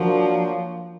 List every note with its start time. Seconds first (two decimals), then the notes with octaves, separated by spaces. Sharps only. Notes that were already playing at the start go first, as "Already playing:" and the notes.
Already playing: F3 F#3 A#3 D4 F#4